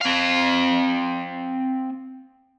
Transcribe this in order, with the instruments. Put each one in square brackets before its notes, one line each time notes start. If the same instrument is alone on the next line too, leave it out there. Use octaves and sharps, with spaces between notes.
[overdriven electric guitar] C4 F5